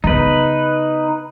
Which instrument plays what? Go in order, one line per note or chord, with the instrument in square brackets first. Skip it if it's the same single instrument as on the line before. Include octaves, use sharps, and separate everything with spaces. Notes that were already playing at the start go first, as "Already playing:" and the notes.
[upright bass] C#3 B3 [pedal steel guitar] D#4 B4